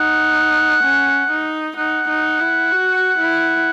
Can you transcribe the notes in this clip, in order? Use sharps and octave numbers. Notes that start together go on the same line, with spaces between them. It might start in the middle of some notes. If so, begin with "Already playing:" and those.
Already playing: D#4 F#5
C#4
D#4
D#4 F#5
D#4
E4
F#4
E4